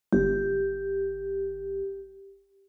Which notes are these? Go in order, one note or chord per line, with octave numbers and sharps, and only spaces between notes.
G1 G4